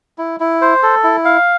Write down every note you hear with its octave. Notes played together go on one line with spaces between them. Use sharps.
E4
E4
C5
A4
E4
F5